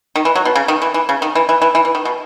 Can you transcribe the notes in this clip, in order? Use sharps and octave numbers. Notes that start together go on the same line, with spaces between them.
D#3
E3
F#3
B2
C#3
D#3
E3
E3
C#3
D#3
E3
E3
E3
E3
E3
D#3
B2